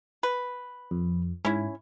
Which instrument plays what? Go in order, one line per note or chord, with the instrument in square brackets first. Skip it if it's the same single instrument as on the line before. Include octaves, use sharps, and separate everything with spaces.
[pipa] B4
[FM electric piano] F2
[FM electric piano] G#2 [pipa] C#4 E4